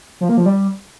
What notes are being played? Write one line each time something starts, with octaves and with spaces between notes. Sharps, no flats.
F3
A#3
F3
G3